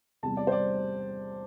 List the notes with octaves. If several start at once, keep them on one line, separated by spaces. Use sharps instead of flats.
E2 C3 G3 A5
D5
C5
D5